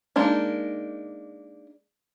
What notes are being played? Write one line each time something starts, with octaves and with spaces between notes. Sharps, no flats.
G#3 A#3 D4 D#4